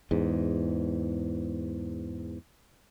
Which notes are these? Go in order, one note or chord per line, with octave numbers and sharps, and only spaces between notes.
E2 G#2